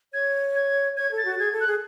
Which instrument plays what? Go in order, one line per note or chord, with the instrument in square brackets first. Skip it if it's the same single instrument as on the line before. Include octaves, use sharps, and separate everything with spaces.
[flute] C#5 [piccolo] G#6
[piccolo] G#6
[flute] C#5 [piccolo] G#6
[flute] A4
[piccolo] A6
[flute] F#4
[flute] G#4 [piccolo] G#6
[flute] A4
[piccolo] F#6
[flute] G#4